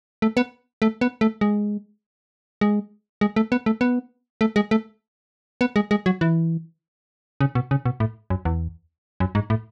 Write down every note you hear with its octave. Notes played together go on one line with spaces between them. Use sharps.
A3
B3
A3
B3
A3
G#3
G#3
G#3
A3
B3
A3
B3
A3
G#3
A3
B3
G#3
G#3
F#3
E3
C#3
B2
C#3
B2
A2
F#2
E2
F#2
G#2
A2